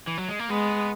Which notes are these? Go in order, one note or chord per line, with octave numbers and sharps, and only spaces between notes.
E3
F#3
G#3
A#3
G#3 B3